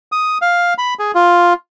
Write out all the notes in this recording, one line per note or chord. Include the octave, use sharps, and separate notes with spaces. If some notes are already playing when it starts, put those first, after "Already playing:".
D#6
F5
B5
G#4
F4